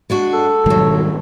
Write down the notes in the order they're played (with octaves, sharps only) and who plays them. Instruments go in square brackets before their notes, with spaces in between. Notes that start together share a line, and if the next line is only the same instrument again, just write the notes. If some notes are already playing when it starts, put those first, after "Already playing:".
[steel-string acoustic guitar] G#3 D4 F#4
[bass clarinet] A4
[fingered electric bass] G#2 D#3 G3 [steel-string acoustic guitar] B2 F#3